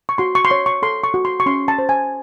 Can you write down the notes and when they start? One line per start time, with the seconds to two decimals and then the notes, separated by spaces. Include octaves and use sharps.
0.09 C#6
0.18 F#4 C6
0.35 C#6
0.45 C6
0.51 C#5 C#6
0.66 C#6
0.82 A4 C6
1.04 C#6
1.14 F#4
1.25 C6
1.40 C#6
1.46 C#4 C6
1.68 A5
1.79 C5
1.89 G#5